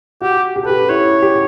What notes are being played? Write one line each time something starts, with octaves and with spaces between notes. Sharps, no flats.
F#4 G4
G4
A4
G4 B4
E4 C#5
G4